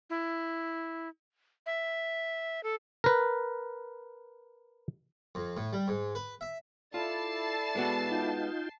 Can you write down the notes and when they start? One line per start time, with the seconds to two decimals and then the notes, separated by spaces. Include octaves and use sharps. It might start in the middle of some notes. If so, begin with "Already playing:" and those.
0.10 E4
1.66 E5
2.63 A4
3.04 A#4 B4
5.35 F2
5.57 A2
5.73 G3
5.88 G#2
6.15 B4
6.41 E5
6.94 E4 F4 A4 D5 A5 A6 C7
7.75 G#3 B3 F#4
8.11 D#4 F4 G5